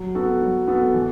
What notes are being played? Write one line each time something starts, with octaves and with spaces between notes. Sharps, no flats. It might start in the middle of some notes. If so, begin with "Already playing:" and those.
Already playing: F#3
B3 F#4 A4
F#3
B3 F#4 A4
E3